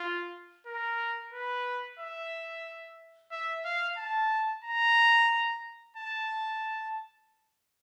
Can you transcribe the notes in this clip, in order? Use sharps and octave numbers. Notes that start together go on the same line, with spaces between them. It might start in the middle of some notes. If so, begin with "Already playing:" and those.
Already playing: F4
A#4
B4
E5
E5
F5
A5
A#5
A5